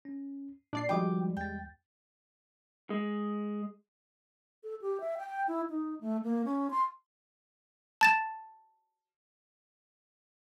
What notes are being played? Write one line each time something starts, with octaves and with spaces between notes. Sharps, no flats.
C#4
A#2 D4 D5 C7
D#3 F3 G3 G#3 F#4 G5 D6
E2 G5 A6
G#3
A4
G4
E5
G5
E4
D#4
A3
A#3
C#4
C6
A5 A6 E7